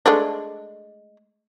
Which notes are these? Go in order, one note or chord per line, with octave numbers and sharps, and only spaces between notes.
G#3 A3 D4